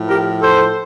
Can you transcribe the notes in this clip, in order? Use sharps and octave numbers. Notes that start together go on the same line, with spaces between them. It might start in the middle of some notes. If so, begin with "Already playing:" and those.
Already playing: A2 F3
G4 A#4
A4 C5